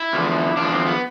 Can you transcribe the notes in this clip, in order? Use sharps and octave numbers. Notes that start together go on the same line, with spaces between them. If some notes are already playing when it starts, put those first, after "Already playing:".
Already playing: E4
E2 D3 F3
E2 D3 F3 D4
C4
B3